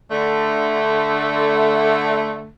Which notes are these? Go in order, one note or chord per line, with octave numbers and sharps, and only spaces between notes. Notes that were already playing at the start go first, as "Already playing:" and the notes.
D3 A3